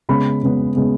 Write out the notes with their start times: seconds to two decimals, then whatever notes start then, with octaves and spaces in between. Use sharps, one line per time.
0.09 C#3 G#3 B3 B5
0.43 C#3 G#3 B3
0.76 C#3 G#3 B3